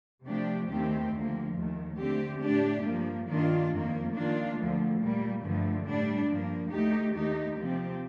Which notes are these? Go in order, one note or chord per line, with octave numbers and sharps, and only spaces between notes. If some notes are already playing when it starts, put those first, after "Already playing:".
C3 F3 A3 D4 G4
D#2 D#3 A3 C4 G4
D2 D3 F3 A#3
D#2 D#3 A3
D3 A3 C4 G4
A2 A3 D4 G4
G2 F3 A#3
G2 D#3 A#3 D4 F4
F2 D#3 A#3
D#3 A#3 D4 F4
D2 D3 F3
A#2 G3 A#3
G2 D3 F3 A3
A2 G3 D4
G2 F3 A#3
D2 D3 A3 D#4 G4
D#2 D#3 A3 D#4 G4
C3 F3 C4 G4